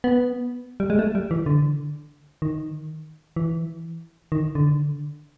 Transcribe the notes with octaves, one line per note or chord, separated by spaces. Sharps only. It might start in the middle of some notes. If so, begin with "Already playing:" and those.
B3
G3
G#3
A3
G3
E3
D3
D#3
E3
D#3
D3